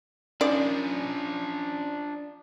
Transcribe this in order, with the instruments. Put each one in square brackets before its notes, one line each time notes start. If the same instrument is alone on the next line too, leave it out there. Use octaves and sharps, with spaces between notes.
[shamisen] D#3 D5 [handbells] C#4 [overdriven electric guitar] D4 F4